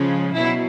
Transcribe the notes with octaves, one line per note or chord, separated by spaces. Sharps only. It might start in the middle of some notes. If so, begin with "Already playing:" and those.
Already playing: C#3 F3 G#3
B2 F#3 E4